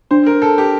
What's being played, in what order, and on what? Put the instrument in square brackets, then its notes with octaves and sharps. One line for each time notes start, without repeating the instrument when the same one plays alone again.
[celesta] D4 [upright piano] C5
[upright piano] A#4
[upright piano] A4 [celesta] A5
[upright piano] G4